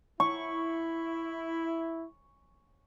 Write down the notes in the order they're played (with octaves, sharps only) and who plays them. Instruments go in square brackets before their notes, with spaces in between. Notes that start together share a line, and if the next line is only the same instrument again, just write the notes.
[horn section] E4 [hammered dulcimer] C#6